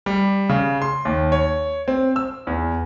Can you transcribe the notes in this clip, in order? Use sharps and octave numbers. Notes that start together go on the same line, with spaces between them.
G3
C#3
C6
D#2
C#5
C4
E6
E2